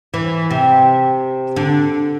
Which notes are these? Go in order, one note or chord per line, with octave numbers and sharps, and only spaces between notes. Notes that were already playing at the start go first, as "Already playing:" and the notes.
E3
C3
D3